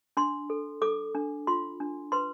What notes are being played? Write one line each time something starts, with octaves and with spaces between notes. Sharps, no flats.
D4 C6
A4
A4 D6
D4
F4 C6
D4
B4 C6